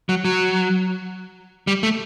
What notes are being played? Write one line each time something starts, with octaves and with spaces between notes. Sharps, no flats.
F#3
F#3
G3
A3